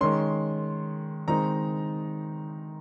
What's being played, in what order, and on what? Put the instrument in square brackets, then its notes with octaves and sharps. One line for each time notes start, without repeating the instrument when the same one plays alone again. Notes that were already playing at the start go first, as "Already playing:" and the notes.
[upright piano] D#3 G#3 C#4 C6
D#3 G#3 C4 D#4 A#5